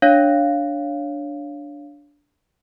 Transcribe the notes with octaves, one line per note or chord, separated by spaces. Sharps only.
D4 C#5 F5